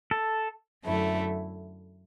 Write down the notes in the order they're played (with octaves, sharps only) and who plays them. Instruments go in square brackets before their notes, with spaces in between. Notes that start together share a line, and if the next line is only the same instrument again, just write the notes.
[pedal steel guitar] A4
[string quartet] F#2 D3 A3 E4